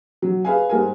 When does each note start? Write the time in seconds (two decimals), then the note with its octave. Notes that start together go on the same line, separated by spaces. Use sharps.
0.22 F#3
0.45 G#4 B4 F5 G#5
0.69 G#2 G3 A#4 G#5